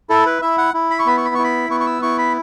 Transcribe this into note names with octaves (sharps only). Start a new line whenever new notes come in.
E4 A4
B4
E4 E5
F#5
E4
B5
C#6
B3 B5
C#6
B5
C#6
E4
B5
B3 C#6
C#6
E6
E4 C#6
B5